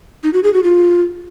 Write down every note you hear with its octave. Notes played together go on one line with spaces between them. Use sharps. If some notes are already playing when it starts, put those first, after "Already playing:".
D#4
F#4
G#4
F#4
F4